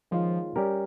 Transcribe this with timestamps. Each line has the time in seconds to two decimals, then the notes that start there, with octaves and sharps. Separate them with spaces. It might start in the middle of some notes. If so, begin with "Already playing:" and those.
0.11 D#3 F3 G#3 C#4 F4 C5
0.56 G3 C#4 G4 A#4